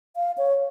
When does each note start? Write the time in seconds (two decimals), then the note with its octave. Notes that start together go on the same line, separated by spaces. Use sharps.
0.16 F5
0.38 C#5